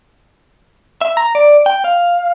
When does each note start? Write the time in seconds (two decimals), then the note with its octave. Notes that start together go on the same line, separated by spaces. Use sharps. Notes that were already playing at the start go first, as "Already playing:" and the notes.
1.01 E5
1.17 A#5
1.35 D5
1.66 G5
1.84 F5